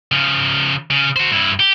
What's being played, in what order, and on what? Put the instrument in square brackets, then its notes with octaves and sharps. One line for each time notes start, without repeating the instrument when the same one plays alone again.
[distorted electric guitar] C#3 F3
C#3
F#4 C5
G2 E4
G4